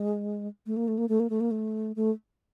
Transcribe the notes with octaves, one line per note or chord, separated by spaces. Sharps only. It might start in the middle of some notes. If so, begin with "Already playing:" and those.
Already playing: G#3
A3
A#3
A3
A#3
A3
A#3
A3
A#3
A3
A3